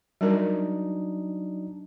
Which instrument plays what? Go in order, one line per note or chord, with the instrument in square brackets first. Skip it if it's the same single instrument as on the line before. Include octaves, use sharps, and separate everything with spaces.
[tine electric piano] F#3 D4 D#4 [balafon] G3 A#4